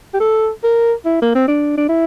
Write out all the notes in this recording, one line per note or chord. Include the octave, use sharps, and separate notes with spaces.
G4
A4
A#4
E4
A#3
C4
D4
D4
E4